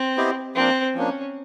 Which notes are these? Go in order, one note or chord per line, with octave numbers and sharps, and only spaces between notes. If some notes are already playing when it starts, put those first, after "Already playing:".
Already playing: C4
B3 E4 G4 C5 D#5
F3 A#3 C4 D4
F3 A#3 C#4 D4